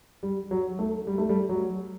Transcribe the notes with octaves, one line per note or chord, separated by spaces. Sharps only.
G3
F#3
A3
G3
A3
G3
F#3